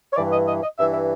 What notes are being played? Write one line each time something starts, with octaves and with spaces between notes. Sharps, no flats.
C#5
G2 E3 D5
D#5
D#5
D#5
G2 E3 E5
E5